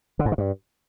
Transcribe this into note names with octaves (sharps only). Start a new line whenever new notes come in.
D3
G#2
D#3
G2